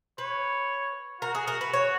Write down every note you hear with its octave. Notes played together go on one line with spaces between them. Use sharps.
B4 C#5
F#4 A#4
G#4
A#4
B4
C#5